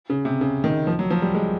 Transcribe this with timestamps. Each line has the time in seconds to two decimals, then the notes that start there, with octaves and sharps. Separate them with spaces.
0.10 C#3
0.25 C3
0.41 C#3
0.64 D#3
0.87 F3
0.99 F#3
1.10 F3
1.22 G3
1.35 G#3